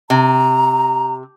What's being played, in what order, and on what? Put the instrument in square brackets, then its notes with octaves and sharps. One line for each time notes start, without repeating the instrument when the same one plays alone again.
[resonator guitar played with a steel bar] C3 [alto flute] A#5